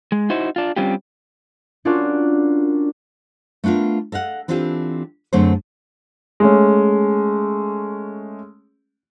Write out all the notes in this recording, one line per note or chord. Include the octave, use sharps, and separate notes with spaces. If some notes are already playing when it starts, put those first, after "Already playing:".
G#3
D#4 E4 F#4 C5
D4 F4
G3 C4 C#4 F4 G4
C#4 D4 F4 F#4 A#4 D5
A3 B3 D4 F4 A#4
A4 D#5 F5 F#5
E3 C4 D4 F4 G4 A4
F#2 D3 A3 C4 G#4 C5
G#3 A3 C#4